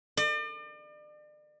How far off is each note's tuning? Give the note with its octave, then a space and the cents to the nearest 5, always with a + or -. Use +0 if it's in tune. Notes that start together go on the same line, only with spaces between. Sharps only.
D5 +40